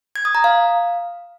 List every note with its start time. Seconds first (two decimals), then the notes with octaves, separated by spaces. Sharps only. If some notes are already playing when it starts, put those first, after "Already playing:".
0.16 G#6
0.25 D#6
0.35 A#5
0.44 F5